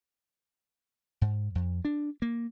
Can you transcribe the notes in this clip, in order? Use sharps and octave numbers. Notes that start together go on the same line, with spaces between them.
G#2
F2
D4
A#3